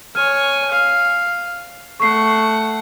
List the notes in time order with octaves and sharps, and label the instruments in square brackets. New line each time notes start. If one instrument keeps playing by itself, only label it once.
[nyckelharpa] C#5 G#5 [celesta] F6
[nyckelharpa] F5
[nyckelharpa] A3 F#5 [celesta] C#6 C7